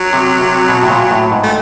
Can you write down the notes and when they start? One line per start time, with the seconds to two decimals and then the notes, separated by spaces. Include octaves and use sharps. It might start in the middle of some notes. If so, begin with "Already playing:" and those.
Already playing: F#3
0.13 C3
0.41 C3
0.69 B2
0.83 A2
0.90 A#2
1.11 A2
1.32 G#2
1.43 A3